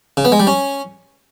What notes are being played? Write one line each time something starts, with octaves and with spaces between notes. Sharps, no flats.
C#3
B3
G#3
G3
C#4